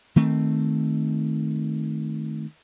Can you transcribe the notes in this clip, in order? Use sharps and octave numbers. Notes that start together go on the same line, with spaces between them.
D#3 A3 C4